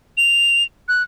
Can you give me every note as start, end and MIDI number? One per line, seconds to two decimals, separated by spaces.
0.17 0.64 101
0.88 1.03 90